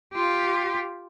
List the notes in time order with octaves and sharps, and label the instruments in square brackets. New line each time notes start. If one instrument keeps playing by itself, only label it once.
[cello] F4 G4